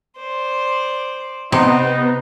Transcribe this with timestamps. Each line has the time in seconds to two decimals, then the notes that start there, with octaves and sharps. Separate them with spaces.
0.18 C5 D5
1.52 C3 B3 C4 D#4